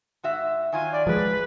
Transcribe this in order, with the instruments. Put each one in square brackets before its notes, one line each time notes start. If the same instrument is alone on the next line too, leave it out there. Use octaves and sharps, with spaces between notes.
[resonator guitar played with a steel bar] G#2 F#4 E5
[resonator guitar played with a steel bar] D#3 F#3 F4 [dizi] G#5
[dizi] D5
[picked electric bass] F3 G#3 [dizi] B4